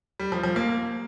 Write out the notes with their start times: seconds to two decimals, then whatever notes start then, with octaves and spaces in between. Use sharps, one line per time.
0.19 G3
0.32 F3
0.44 F3
0.56 A#3